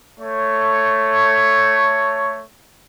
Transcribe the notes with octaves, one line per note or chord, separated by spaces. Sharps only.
A3 C#5